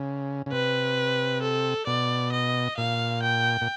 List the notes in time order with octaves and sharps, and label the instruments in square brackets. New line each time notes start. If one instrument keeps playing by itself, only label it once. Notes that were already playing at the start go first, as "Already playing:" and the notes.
Already playing: [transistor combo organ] C#3
C#3
[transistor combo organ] C3 [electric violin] B4
[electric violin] A4
[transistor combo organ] B2 [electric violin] D5
[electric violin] D#5
[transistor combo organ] A#2 [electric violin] F5
[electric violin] G5
[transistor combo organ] A#2